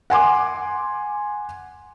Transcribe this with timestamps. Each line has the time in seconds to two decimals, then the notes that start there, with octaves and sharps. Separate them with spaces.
0.10 F#5 G#5 C6 D6